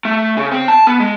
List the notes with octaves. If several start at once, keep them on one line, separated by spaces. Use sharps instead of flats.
A3
C#3
C4
A5
B3
G#3